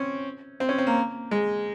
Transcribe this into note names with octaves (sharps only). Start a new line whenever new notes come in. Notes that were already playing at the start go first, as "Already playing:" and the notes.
Already playing: C4 C#4
C4
C#4
C4
A#3
G#3